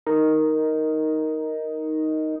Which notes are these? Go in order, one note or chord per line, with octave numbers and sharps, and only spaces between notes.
D#4 A#4